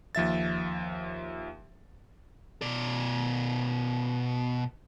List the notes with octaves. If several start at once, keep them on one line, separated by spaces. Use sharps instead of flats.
D#2 F3 E5 A6
B2 D5